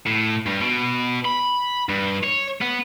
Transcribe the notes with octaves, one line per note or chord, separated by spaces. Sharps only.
A2
G2
B2
B5
G2
C#5
B3